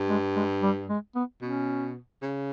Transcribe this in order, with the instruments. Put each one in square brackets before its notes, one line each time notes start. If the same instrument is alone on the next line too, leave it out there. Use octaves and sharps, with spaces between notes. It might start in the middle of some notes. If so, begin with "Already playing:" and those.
Already playing: [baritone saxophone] G2
[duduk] G#3
G#3
G3
G#3
B3
[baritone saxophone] B2 [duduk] C#4
[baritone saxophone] C#3